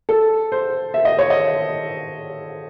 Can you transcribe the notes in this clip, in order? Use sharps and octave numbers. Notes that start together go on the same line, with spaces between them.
A4
C5
E5
D#5
C#5
D#5